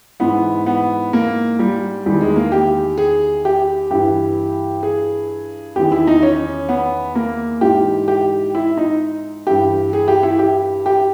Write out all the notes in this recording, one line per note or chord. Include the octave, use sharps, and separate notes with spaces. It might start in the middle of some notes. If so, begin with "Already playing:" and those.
G#2 E3 B3
B3
A#3
G3
E2 D#3 G3
G#3
A#3
G4
G#4
G4
G2 E3 G4
G#4
E2 D#3 G4
E4
D#4
C#4
B3
A#3
G#2 E3 G4
G4
E4
D#4
G2 E3 G4
G#4
G4
E4
G4
G4